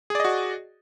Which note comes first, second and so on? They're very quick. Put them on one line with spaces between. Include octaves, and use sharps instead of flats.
G#4 D5 D#5 F#4